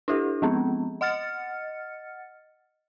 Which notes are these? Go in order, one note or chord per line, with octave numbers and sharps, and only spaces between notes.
D4 E4 G4 A4
F3 G#3 B3 C4
D#5 F#5 F6 A6 C#7